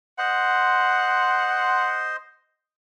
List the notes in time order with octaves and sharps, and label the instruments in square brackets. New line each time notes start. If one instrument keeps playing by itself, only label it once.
[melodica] C5 D#5 C6 [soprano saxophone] F#5